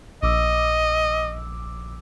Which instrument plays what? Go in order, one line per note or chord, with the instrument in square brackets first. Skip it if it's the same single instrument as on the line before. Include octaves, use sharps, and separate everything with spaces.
[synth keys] A#1 D6 E6 [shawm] D#5